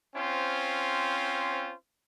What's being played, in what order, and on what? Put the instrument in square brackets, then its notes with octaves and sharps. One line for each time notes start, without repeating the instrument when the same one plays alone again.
[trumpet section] C4 C#4 F4 C5